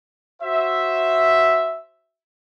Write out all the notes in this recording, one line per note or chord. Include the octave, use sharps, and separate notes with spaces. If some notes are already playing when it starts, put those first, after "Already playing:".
F#4 C5 E5